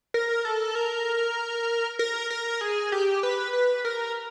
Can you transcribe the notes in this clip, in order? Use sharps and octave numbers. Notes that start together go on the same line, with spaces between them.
A#4
A4
A#4
A#4
A#4
G#4
G4
B4
B4
A#4